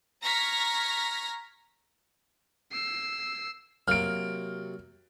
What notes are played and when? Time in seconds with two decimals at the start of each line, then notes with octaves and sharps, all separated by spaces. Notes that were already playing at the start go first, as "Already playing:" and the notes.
0.22 A#5 C#6 F6 G#6 A#6 B6
2.72 E6 C7
3.88 C3 F#3 A#3 F6 D7